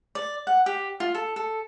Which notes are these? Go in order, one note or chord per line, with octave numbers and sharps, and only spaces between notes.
D5
F#5
G4
F4
A4
A4